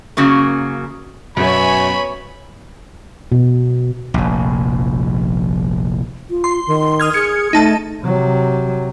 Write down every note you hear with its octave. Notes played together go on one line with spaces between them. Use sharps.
F#2 C#3 F#3 A#3
F#2 B2 B3 C#5 E5 G#5 B5
B2
F1 A#1
F4
C6
D#3
D#6 F6 G#6
G#4 G#6 C#7
A3 D#4 A5
C3 F#3